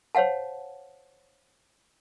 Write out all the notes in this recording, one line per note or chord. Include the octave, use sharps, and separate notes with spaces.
C5 C#5 F5 F#5 A5